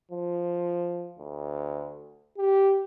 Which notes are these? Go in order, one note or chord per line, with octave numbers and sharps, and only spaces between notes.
F3
D2
G4